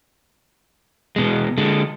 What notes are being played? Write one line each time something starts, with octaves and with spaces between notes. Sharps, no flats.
B2 G#3
D3 G#3